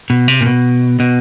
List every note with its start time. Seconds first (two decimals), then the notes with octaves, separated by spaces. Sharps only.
0.10 B2
0.28 C3
0.41 A#2
0.46 B2
1.00 B2